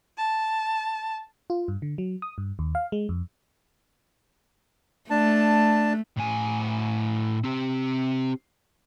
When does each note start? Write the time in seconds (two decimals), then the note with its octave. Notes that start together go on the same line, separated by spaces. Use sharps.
0.18 A5
1.50 F4
1.68 G2
1.82 D3
1.98 F#3
2.22 D#6
2.38 G2
2.59 D#2
2.75 F5
2.92 G#3
3.09 F2
5.10 A3 D4 A5
6.17 A2 G#5
7.44 C4 G4